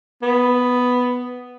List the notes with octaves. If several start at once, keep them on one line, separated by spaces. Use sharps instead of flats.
B3